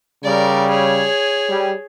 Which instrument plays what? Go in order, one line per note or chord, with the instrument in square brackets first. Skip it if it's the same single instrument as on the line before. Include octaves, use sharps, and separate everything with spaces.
[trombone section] C#3 G3 [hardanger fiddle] A#4 D5
[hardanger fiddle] G#4 C#5
[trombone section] G3